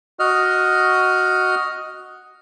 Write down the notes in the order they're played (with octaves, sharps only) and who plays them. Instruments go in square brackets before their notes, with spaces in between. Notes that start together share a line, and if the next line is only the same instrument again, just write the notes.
[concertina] F#4 D#5 F6